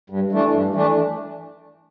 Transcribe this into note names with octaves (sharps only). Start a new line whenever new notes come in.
G2
E3 A3 D4
G2
E3 A3 D4